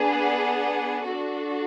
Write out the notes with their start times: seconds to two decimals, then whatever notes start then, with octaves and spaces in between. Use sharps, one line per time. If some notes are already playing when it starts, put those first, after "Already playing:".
Already playing: B3 D4 G#4
0.15 F#5
1.06 D4 F#4 A4